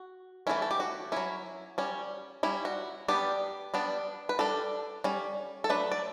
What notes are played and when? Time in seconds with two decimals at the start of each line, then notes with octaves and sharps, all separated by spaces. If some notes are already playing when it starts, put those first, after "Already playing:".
Already playing: F#4
0.47 E3 A3 C#4 E4
0.62 A4
0.71 G4
0.80 F#4
1.12 F#3 C#4 E4
1.78 G3 C#4
2.43 G3 C#4 E4
2.65 F#4
3.08 G3 B3 D4 G4
3.74 G3 B3 D4
4.29 B4
4.39 G3 D4 A4
5.04 G3 C#4
5.64 A4
5.69 F#3 A3 D4 B4
5.91 D5